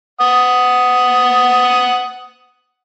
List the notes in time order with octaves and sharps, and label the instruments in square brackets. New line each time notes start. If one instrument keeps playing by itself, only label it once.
[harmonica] F#5 D#6